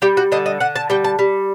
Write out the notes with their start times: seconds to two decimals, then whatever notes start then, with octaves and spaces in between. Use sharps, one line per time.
0.02 G3 G4
0.17 F#4
0.32 D3 D#5
0.46 D#5
0.60 D3 F#5
0.76 A5
0.90 G3 G5
1.04 A5
1.19 G3